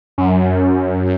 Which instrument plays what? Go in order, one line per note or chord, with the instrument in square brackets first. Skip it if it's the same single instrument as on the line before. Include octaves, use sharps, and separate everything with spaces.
[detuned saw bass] F#2